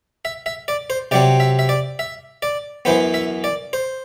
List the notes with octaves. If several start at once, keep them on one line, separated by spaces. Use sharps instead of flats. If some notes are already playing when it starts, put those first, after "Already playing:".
E5
E5
D5
C5
C3 F#3 C4 D5
E5
E5
D5
E5
D5
F#2 E3 B3 C5
E5
D5
C5